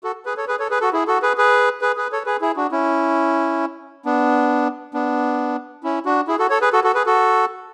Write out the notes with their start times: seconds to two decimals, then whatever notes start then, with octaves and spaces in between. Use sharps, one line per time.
0.04 F#4 A4
0.26 G#4 B4
0.37 A4 C#5
0.48 G#4 B4
0.59 A4 C#5
0.70 G#4 B4
0.81 F#4 A4
0.93 E4 G#4
1.07 F#4 A4
1.22 G#4 B4
1.38 G#4 B4
1.81 G#4 B4
1.96 G#4 B4
2.12 A4 C#5
2.26 G#4 B4
2.41 E4 G#4
2.56 D4 F#4
2.72 C#4 E4
4.05 B3 D4
4.94 B3 D4
5.83 C#4 E4
6.05 D4 F#4
6.28 E4 G#4
6.39 F#4 A4
6.50 A4 C#5
6.61 G#4 B4
6.73 F#4 A4
6.84 F#4 A4
6.95 G#4 B4
7.06 F#4 A4